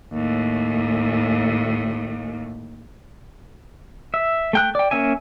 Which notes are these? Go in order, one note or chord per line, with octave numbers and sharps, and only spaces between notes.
D#2 A2
E5
A3 G5 F#6
D5 G5
A#3 C#4 E5 G#5